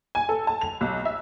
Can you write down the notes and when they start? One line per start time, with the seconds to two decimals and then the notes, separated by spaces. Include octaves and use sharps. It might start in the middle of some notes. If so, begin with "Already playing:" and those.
0.15 G#5
0.29 A4
0.47 A5
0.61 F7
0.81 B1
1.05 E5